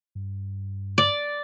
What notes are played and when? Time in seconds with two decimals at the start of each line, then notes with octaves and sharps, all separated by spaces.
0.15 G2
0.98 D5